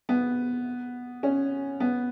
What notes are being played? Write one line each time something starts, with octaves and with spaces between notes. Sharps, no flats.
B3
C#4
B3